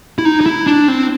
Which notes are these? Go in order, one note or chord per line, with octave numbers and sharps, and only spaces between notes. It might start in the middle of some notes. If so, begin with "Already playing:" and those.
E4
D#4
D#4
E4
D4
C4